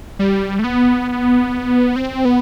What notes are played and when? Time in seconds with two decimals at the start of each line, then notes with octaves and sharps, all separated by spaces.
0.19 G3
0.59 A3
0.64 B3
1.96 C4
2.25 B3